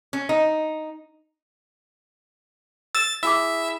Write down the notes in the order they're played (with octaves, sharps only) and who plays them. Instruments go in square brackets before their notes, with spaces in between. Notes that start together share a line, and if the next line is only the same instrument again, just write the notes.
[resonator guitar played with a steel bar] C#4
D#4
[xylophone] E6 E7 [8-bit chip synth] A6
[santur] E4 G#4 [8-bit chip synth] E5 [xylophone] D6 E6